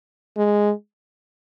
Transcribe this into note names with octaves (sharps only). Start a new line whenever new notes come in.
G#3